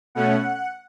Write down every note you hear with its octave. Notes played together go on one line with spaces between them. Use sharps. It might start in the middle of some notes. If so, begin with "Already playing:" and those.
B2 A3 C#4 F#5